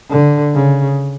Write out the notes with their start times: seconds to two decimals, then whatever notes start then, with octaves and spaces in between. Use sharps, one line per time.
0.10 D3
0.55 C#3